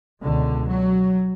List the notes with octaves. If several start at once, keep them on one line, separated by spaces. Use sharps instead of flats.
C#2 B2 D3
F#3